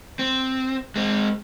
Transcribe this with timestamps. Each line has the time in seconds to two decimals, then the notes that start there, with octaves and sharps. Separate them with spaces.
0.19 C4
0.96 G#3 C4